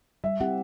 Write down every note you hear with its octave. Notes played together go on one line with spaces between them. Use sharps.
G3 E5
C4 E4 G4 F#5